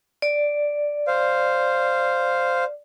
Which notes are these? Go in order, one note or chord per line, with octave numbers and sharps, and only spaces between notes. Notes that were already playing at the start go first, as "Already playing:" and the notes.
D5
C5 F5